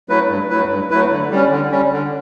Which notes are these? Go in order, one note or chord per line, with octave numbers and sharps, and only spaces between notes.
F#3 A3 E4 B4
G2
F#3 A3 E4 B4
G2
F#3 A3 E4 B4
D3
G3 C#4
D3
G3 C#4
D3